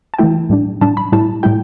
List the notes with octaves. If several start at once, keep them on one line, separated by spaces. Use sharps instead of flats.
A5
E3 A3 E4 G5
A2 G3 D4
A2 G3 D4 A5
B5
A2 G3 E4 A5
A2 G3 E4 G5